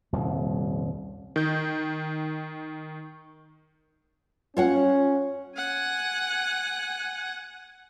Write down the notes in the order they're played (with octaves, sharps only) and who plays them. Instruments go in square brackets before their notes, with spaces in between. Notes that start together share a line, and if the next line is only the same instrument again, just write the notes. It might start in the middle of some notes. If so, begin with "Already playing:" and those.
[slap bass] D#1 C2 F2
[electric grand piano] D#3 G6
[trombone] C#4 [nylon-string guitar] F4 C#5 F#5
[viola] F#5 G#5